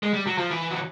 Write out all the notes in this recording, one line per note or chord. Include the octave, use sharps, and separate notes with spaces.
G#3
G3
F#3
F3
E3
F#3